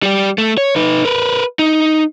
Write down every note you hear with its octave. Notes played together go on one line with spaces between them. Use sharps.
G3 G4
A3
C#5
D#4 B4
A#4 B4
D#4